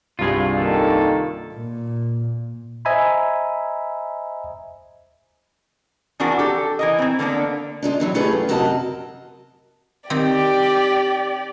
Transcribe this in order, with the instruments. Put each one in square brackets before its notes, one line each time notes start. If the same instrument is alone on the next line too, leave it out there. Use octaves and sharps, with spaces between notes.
[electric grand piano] C2 G2 [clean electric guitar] F4 G#4
[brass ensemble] D#3 A#3 A4
[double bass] A#2
[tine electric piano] C5 D#5 E5 G#5 A#5 B5
[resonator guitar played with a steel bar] E3 F3 D4 F#4 A#4
G4 A4
E3 A#4 D#5
E3 C4
D3 A#3 B3 D4
[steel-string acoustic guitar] D4 D#4 G#4 C5
A2 E3 F#3
A3 C#4 F4 G4 G#4 B4
F#2
F#2 C3 F#4 A#4 D#5 A5
[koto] D#3 C4 [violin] G4 D5